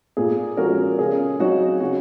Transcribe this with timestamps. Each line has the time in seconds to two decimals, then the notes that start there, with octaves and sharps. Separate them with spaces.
0.17 A#2 G#4
0.57 F3 G#3 C#4 F#4 A#4
0.98 C#3 G#4
1.39 F#3 C4 D#4 F#4
1.80 C#3 F#4